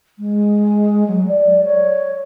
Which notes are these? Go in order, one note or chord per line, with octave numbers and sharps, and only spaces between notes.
G#3
F#3
D5
C#5